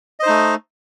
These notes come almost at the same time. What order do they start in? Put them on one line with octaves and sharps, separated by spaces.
D#5 C5 D#4 A3